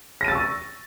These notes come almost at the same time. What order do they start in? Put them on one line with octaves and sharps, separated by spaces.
A#6 D#7 A6 E6 C#6